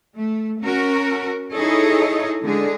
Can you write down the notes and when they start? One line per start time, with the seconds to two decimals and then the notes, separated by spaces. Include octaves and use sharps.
0.17 A3
0.62 C#4 F#4 A#4
1.53 D#4 E4 G#4 A4 C#5 D#5
2.44 D3 G#3 G#4